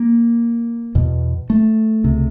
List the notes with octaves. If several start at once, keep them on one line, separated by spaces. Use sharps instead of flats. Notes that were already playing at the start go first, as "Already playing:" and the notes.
Already playing: A#3
E2 B2
A3
C#2 C3